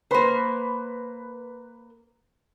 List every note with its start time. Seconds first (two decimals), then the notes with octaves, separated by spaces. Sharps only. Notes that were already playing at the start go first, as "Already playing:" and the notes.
0.11 A#3 B4 C5 B5